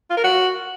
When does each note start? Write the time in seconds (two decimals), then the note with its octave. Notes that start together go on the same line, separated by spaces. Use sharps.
0.10 F4
0.17 A#4
0.24 F#4